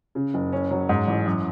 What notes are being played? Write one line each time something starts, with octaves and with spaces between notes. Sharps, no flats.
C#3
F#1
C#4
F#3
G#2
A1
F#2